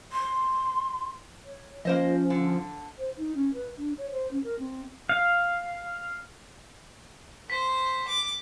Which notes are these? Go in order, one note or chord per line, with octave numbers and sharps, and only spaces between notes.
C6
C#5
F3 A#3 C#4 C5 D#5
D3
C5
D#4
C#4
B4
D4
C#5
C5
C#4
A#4
C4
F5
C5 B6
D6